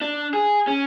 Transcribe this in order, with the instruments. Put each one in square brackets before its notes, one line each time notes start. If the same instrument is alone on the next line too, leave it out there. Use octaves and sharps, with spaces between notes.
[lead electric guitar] D4
G#4
C#4